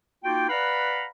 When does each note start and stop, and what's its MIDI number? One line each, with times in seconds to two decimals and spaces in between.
0.24 0.47 58
0.24 0.47 63
0.24 0.47 65
0.24 0.47 66
0.24 0.47 79
0.49 1.05 71
0.49 1.05 74
0.49 1.05 77
0.49 1.05 78
0.49 1.05 82
0.49 1.05 83